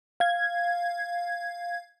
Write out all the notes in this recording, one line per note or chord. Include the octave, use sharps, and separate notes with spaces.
F5 G#6